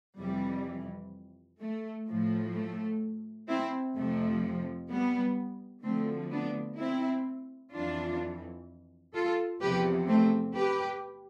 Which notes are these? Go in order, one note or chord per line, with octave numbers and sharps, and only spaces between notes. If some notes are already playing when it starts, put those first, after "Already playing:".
F2 C3 E3 G3
A3
A2 F3
A3
C4 E4
F2 C3 F3 A3
G3 B3
D2 D3 F3 A3 C4
B3 D4
C4 E4
F2 E3 D4 F4
F4 A4
E2 C3 F3 G4 B4
A3 C4
G4 B4